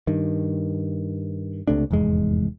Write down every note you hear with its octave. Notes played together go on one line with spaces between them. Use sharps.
G2 D#3
C#2 C3 A3 D4
F1 E2 G#2 G#3